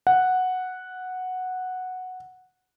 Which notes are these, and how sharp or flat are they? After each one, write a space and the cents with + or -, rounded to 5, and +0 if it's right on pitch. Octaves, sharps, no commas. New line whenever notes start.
F#5 -5